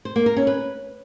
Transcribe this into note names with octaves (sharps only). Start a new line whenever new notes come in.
C5
A#3
A#4
C#4
B4